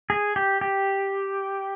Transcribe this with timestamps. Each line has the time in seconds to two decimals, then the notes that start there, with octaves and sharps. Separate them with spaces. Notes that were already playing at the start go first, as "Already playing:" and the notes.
0.10 G#4
0.36 G4
0.61 G4